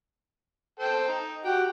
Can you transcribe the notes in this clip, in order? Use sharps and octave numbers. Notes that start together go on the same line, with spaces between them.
A4 C5 G5
D#4
F#4 G4 F#5 G5